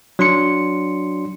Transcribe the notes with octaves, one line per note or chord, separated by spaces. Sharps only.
F#3 D4 C6 C#7